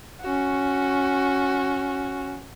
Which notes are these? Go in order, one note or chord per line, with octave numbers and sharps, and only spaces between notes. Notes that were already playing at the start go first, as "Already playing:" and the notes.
C#4 F#4